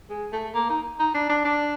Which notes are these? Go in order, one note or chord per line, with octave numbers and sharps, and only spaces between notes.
G#3
A3
A#3
D#4
D#4
D4
D4
D4